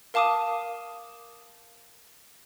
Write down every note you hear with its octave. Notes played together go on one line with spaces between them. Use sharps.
A#4 F5 A5 D6 D#6 D#7